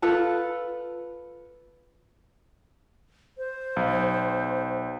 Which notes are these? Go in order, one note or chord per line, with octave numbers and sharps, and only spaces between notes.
F4 A4 B4 A5
C5
B1